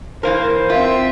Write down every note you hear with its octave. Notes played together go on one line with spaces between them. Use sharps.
E3 A#3 A#4 C5
C4 F4 E5